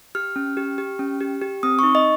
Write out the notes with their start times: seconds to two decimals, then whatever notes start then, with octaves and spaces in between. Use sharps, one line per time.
0.15 G4 F6
0.36 C#4
0.57 G4
0.78 G4
0.99 C#4
1.21 G4
1.42 G4
1.63 C4 D#6
1.79 D#4 C#6
1.95 D#5